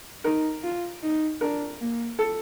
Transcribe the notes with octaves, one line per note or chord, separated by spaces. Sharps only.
D#4 A#4
F4
D#4
D4 A#4
A#3
A4